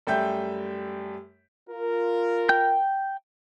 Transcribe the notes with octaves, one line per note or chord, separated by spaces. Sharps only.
F#2 G3 A3 E5 G5 G6
F4 A#4
G5 G6